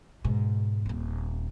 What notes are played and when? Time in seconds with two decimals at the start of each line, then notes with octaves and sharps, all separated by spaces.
0.24 G#2 B2
0.86 D#1 C4